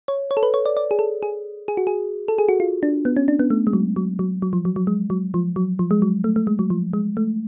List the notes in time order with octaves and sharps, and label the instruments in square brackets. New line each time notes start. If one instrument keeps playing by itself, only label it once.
[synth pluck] C#5
C#5
A4
B4
C#5
D5
D5
G#4
A4
G#4
G#4
F#4
G#4
A4
G#4
F#4
F4
D4
B3
C#4
D4
B3
A3
G#3
F#3
F#3
F#3
F#3
F3
F#3
F#3
G#3
F#3
F3
F#3
F3
G#3
F#3
A3
A3
G#3
F#3
F3
G#3
A3